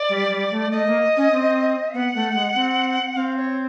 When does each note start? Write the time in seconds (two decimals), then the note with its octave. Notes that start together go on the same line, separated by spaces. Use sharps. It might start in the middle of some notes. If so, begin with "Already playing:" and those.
Already playing: D5
0.09 G3
0.29 G3
0.51 A3
0.71 A3 D#5
0.87 A#3
1.17 C#4
1.32 C4
1.94 B3 F#5
2.15 A3
2.34 G#3
2.55 C4
3.16 C4 F5
3.37 C#5